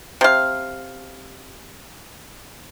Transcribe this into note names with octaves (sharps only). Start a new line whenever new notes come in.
C3 F5